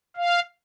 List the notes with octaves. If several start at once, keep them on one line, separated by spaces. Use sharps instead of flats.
F5